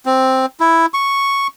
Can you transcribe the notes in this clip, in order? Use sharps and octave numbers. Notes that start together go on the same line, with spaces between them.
C4
E4
C#6